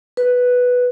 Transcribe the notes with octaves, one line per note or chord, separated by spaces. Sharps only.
B4